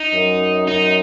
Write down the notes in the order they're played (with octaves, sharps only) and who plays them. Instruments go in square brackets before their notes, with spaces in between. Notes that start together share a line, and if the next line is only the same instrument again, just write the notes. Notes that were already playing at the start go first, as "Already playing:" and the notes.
Already playing: [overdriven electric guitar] D#4
[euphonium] F#2
[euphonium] F#2 [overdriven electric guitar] D#4